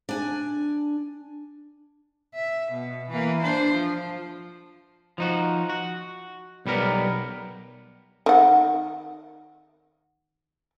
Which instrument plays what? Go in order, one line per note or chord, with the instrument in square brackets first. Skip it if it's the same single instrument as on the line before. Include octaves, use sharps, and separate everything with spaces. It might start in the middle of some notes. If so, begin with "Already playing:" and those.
[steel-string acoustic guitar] D4 G#5
[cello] E5
B2
E3 A#3
D4 C5
F3
[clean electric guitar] F3 D#4 F#4
F#4
B1 G3 B3 A#4
[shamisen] D#3 F#5